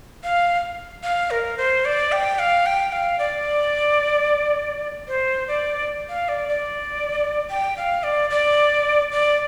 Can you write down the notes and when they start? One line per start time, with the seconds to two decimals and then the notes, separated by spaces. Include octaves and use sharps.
0.24 F5
1.03 F5
1.31 A#4
1.57 C5
1.85 D5
2.12 G5
2.39 F5
2.66 G5
2.92 F5
3.19 D5
5.08 C5
5.48 D5
6.09 F5
6.29 D5
6.49 D5
7.50 G5
7.77 F5
8.03 D5
8.30 D5
9.12 D5